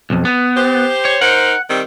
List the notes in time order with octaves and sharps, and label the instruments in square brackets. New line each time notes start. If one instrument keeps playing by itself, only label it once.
[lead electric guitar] B1 F2
B3
[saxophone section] G4 C5
[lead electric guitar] C#5
[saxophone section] D#4 A#4 C5 [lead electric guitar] F#5
[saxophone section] D#3 G3 C4